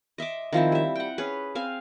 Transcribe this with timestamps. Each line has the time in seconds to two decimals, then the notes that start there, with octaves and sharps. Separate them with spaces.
0.18 D#5 E5 C6 D6
0.53 D#3 F3 C4 E4
0.72 G3 E5
0.96 F#5 G5
1.18 C#4 G#4 B4
1.55 C4 F5 G#5